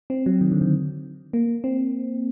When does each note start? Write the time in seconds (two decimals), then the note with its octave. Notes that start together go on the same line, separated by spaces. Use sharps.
0.10 C4
0.26 F#3
0.41 D#3
0.52 D3
0.61 D#3
1.33 A#3
1.64 C4